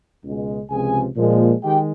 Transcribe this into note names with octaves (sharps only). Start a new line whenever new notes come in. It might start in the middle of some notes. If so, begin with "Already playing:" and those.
C#2 B2 G#3
C#2 C3 F3 G#4 G#5
A#2 F3 G#3
D#3 G#3 G4 G5